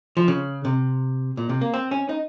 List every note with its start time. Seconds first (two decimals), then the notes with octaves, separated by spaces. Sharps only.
0.17 F3
0.28 C#3
0.65 C3
1.37 A#2
1.49 C3
1.61 A#3
1.74 C4
1.91 C#4
2.09 D#4